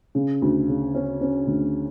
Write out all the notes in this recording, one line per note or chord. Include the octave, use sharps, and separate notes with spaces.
C#3
D2
C#3
C#4
C#4
D2